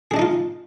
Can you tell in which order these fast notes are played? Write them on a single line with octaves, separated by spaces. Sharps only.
G#4 D4 D#5 D#4 F4